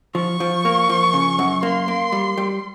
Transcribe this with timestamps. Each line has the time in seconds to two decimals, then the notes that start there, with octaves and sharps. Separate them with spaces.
0.15 F3 C#6
0.40 F3
0.65 A#3
0.89 F3
1.13 C#3
1.39 F#2
1.63 A#3 C6
1.88 A#3
2.12 G3
2.37 G3